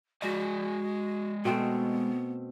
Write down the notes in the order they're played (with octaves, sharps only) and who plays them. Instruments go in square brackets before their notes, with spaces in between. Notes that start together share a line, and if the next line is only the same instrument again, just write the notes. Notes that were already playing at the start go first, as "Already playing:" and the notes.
[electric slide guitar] G#3 D5 D#5 [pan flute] F#4
[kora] B2 A3 C4 [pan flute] B3